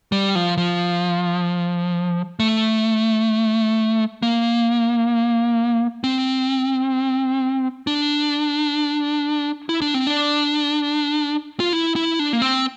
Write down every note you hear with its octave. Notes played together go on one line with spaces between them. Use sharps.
G3
F3
F3
A3
A#3
C4
D4
E4
D4
C4
D4
F4
E4
E4
D4
A#3
C4